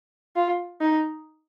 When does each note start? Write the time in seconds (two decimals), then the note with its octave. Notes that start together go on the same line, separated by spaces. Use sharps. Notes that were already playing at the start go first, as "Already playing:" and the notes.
0.36 F4
0.81 D#4